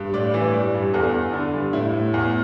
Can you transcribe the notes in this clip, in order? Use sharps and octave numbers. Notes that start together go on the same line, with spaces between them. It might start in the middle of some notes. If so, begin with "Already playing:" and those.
Already playing: G2
A2 D5
E3
G3
G2
E2 A4
E2
D3
G2
A2 E4
A2
E2